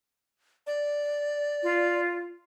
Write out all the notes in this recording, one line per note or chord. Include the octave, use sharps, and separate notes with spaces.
D5
F4